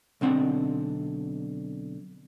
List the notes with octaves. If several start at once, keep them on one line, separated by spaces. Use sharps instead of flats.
B1 D3 C4 F#5